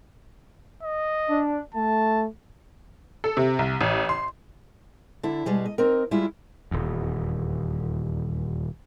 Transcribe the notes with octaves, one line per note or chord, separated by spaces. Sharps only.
D#5
D4
A3 A5
A4
C3
C2
A1
C6
D3 D4 E4
B2 G3 G#3 G#4
D#5
C4 D#4 A#4
G3 G#3 E4 F4
D#1 E2